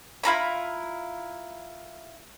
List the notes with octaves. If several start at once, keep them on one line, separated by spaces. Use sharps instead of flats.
E4 F4 A#5 B5